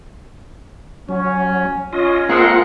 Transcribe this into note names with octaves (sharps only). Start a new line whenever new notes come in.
F#3 C#4
C#4 F4 D#5
G#3 A#3 C4 F4 A4 C5 F#5 A#5